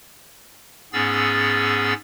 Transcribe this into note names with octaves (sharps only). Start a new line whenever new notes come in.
G#2 B3 C#4 G#4 E6 A6